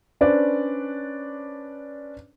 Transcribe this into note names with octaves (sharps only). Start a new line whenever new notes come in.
C#4 D4 B4 C5 D5